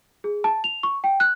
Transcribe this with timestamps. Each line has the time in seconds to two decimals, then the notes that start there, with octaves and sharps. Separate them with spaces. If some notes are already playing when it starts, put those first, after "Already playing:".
0.24 G#4
0.44 A5
0.64 F7
0.83 C#6
1.04 G5
1.20 F#6